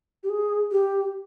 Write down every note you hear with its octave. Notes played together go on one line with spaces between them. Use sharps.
G4
G#4
G4